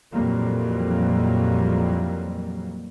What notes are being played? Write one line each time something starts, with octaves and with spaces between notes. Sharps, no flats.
F2 A#2 E3 F#3 G3 A#3